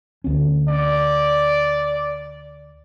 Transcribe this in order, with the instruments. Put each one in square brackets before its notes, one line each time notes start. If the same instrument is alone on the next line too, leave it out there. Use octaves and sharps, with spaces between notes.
[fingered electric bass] D2 C#4
[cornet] D5